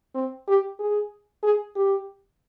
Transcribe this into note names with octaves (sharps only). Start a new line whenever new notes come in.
C4
G4
G#4
G#4
G4